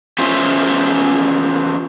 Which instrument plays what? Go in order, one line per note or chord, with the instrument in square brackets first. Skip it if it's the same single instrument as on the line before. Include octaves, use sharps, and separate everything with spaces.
[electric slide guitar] E2 C#4 F4 C5 E5